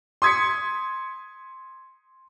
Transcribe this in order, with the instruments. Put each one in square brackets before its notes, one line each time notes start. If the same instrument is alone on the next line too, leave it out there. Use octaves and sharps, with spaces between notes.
[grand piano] C6 D#6 G#6 B6 C#7